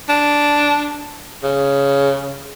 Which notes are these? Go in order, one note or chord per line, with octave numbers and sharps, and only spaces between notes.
D4
C#3